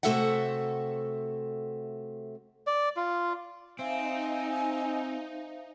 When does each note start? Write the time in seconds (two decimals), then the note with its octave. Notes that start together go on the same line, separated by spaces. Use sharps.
0.03 C3 A3 F#4 A4 E5 F#5
2.67 D5
2.96 F4
3.79 C4 D#4 C5 E5 F5 G#5